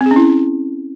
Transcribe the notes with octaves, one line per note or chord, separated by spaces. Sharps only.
C4
G#4
C#4
E4